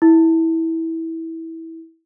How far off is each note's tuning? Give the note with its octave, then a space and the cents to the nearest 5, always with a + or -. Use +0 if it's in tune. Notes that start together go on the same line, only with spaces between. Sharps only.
E4 -15